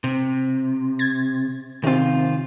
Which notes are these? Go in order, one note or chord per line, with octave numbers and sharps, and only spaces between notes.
C3
G#6 A6
C3 D#3 C4 F4